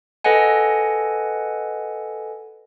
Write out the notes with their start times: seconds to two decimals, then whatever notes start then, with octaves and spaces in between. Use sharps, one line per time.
0.24 A4 B4 D#5 F#5 G#5